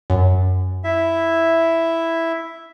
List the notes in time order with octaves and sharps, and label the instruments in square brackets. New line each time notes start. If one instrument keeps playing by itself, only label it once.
[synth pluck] F#2
[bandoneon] E4 E5